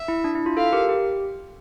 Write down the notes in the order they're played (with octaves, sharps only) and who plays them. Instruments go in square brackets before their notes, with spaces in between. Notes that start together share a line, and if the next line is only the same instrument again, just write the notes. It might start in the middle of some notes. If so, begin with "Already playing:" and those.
Already playing: [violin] E5
[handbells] E4
D4
E4
F4
[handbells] F4 A4 [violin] F5
[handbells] G4 A#4
G4